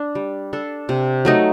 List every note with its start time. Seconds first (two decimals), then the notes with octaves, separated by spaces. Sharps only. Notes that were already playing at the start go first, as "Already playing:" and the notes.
Already playing: D4
0.15 G3
0.53 D4 A4
0.89 C3
1.25 F#3 A3 D#4